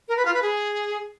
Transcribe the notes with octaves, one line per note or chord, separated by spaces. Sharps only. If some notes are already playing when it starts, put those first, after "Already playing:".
A#4
B4
F4
B4
G#4